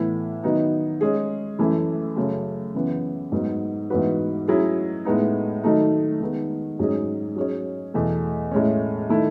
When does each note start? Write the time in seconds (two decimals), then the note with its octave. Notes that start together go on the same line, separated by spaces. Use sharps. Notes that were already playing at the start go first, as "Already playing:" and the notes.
Already playing: A2 E3 B3 E4
0.43 D#3 F#3 B3 D#4
1.01 G#3 C#4 G#4
1.59 F#2 E3 A3 E4
2.16 F#2 C#3 F#3 A3 C#4
2.74 F#2 C#3 E3 B3
3.32 G#2 F#3 B3
3.90 G#2 E3 B3 F#4 B4
4.48 F#3 C#4 E4 G#4
5.05 A2 G#3 B3 D#4
5.64 D#3 F#3 A3 D#4
6.20 D#3 G#3 B3
6.79 G#2 F#3 C#4 G#4 D#5
7.36 F#3 C#4 G#4 C#5
7.94 E2 B2 A3
8.51 A2 G#3 C#4
9.09 D#3 A3 E4